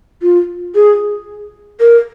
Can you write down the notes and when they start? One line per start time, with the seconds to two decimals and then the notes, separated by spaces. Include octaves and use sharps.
0.23 F4
0.75 G#4
1.80 A#4